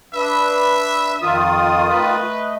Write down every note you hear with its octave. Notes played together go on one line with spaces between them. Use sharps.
D4 B4 E5
F2 D#3 F4 D#6
A3 B4 D#5